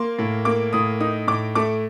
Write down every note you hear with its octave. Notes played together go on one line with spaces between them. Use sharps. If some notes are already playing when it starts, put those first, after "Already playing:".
Already playing: A#3 C6
A2
A#3 D6
A2 D#6
D#4 D#6
A2 D6
A3 D6